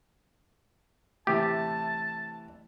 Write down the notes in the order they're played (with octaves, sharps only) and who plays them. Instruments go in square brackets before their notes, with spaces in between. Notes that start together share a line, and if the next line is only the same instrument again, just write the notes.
[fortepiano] A2 C3 E3 [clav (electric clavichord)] G4 [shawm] A5